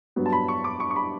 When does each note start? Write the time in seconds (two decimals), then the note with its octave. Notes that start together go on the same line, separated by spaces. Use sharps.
0.16 G2 F#3 B3
0.26 A5
0.32 B5
0.48 C#6
0.64 D6
0.80 C#6
0.91 C#6
0.96 B5